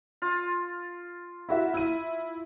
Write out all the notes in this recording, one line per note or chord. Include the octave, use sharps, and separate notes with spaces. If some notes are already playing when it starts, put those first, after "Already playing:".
F4
E4 F#4 E5
E4 D#7